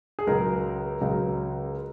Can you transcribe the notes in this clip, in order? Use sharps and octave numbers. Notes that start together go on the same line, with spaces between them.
G#4
C#2 C#3 F#3 A#4
C#2 C#3 F#3